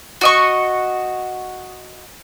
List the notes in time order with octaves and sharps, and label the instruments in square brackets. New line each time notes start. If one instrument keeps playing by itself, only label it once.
[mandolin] F#4 D#5 C#6